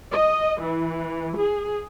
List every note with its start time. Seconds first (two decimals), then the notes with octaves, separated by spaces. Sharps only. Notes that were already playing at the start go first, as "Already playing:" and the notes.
0.11 D#5
0.60 E3
1.37 G#4